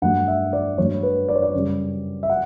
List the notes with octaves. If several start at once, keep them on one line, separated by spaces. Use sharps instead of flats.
G2 F#3 A3 F#5
E5
D5
G2 F#3 A3 C#5
B4
D5
C#5
D5
F#2 C#3 G3
E5
F#5